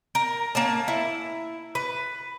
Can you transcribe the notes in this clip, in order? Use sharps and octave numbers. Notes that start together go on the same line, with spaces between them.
A#4
A#3 C#4 A5
E4
B4